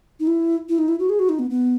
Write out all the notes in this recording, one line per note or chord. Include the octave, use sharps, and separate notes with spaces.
D#4
E4
E4
D#4
E4
F#4
G#4
F#4
D#4
B3
B3